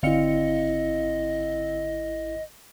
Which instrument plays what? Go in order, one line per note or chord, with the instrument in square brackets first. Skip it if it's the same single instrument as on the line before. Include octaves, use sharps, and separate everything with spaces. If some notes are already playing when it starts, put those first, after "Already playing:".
[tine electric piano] G#1 E4 [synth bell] D3 F5 C#7 [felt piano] C4 [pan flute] D#5